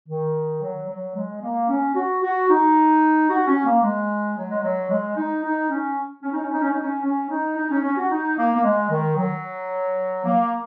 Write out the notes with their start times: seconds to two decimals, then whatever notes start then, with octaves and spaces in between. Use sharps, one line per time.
0.08 D#3
0.62 F#3
0.89 F#3
1.15 G#3
1.42 A#3
1.69 C#4
1.96 F#4
2.23 F#4
2.50 D#4
3.30 F#4
3.47 C#4
3.65 A#3
3.83 G#3
4.37 F#3
4.51 G#3
4.63 F#3
4.90 G#3
5.16 D#4
5.44 D#4
5.70 C#4
6.23 C#4
6.33 D#4
6.43 C#4
6.52 D#4
6.61 C#4
6.72 D#4
6.82 C#4
7.04 C#4
7.30 D#4
7.57 D#4
7.70 C#4
7.83 C#4
7.97 F#4
8.11 D#4
8.38 A#3
8.55 A#3
8.64 G#3
8.90 D#3
9.17 F#3
10.25 A#3